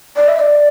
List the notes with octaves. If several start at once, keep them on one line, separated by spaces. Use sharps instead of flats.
D5
E5
D5